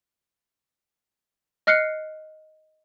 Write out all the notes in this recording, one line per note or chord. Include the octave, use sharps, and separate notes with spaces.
D#5 F6 F#6 C7 C#7